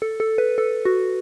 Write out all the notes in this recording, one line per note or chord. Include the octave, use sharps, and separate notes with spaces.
A4
A4
B4
A4
F#4